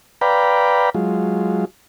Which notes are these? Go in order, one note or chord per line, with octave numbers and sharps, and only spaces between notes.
B4 D5 F5 G5 A#5 B5
F#3 G#3 F4